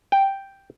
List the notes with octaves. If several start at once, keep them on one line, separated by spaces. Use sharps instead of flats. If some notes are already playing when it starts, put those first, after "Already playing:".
G5